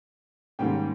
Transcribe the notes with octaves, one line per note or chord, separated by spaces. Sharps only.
G#2 D#3 G3 A#3 C#4 G5